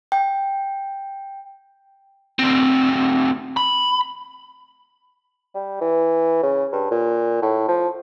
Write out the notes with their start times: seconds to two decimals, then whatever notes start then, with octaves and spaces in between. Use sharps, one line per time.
0.12 G5
2.39 D2 C4
3.57 B5
5.54 G3
5.81 E3
6.43 C#3
6.73 G2
6.91 A#2
7.42 A2
7.68 F3